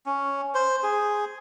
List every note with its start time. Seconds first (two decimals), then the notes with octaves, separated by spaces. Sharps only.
0.06 C#4
0.54 C5
0.83 G#4